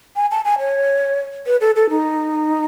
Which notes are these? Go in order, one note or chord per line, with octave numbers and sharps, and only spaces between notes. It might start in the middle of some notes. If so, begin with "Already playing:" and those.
G#5
A5
G#5
C#5
B4
A4
A4
D#4